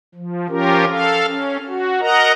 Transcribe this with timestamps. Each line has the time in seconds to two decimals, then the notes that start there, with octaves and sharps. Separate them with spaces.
0.15 F3
0.49 F3 C#4 F4 G4 A#4
0.89 A4 F5
1.27 C#4
1.68 F#4
2.01 A#4 D#5 F#5 A#5